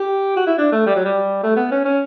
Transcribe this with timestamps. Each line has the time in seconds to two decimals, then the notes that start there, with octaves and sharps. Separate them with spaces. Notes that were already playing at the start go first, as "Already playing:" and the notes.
Already playing: G4
0.36 F#4
0.46 E4
0.58 D4
0.72 A3
0.86 G3
0.96 F#3
1.05 G3
1.43 A3
1.56 B3
1.71 C#4
1.85 C#4